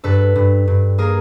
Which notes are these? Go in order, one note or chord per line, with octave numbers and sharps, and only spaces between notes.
G2 A4 B4
G2
G2
A#3 G#4 A#4